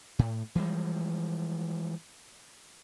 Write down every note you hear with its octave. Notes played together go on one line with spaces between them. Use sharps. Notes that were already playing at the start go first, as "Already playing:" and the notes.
A2
E3 F3 G3 G#3